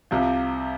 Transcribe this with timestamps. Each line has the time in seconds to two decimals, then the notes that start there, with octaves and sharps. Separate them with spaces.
0.11 C2 C3 F3